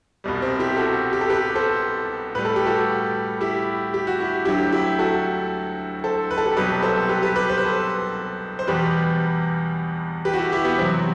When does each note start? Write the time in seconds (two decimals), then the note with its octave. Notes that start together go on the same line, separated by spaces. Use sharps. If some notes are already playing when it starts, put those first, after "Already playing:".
0.24 C2 B2 G3
0.42 C4
0.59 E4 G4
0.77 F#4 A4
1.13 G4
1.21 A4
1.29 G4 B4
1.55 A4 C5
2.35 A2 G3 B4
2.45 A4
2.56 G4
2.66 F#4 A4
3.41 E4 G4
3.94 G4
4.07 F#4
4.20 E4 G4
4.45 D2 D3 F#3 E4 G4
4.72 E4 G4
4.99 F#4 A4
6.04 A4 C5
6.31 B4
6.38 A4
6.46 G4 B4
6.56 C2 B2 F#3 G4 B4
6.83 A4 C5
7.09 G4 B4
7.22 G4 B4
7.36 G4 B4
7.50 C5
7.58 B4
7.66 A4 C5
8.59 C5
8.67 E2 B2 G3 G4 B4
10.25 G4 B4
10.33 F#4
10.38 E4 G4
10.52 E4 G4
10.65 B3
10.78 E2 C3 F#3 C4